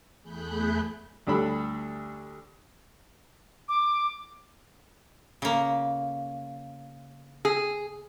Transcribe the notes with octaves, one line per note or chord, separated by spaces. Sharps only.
E2 A3 G#4 B5 F#6 G6
D2 G3 D4 A4 B5
D6
C#3 A#3
G#4